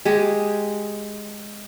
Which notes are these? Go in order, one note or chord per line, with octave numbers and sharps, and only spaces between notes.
G#3 G4 G#4